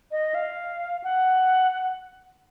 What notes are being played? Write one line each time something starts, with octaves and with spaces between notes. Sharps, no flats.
D#5
F5
F#5